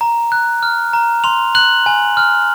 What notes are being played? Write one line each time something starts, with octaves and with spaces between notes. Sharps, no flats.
A#5
F#6
F6
A#5
C6 F7
F#6 F#7
G#5
F6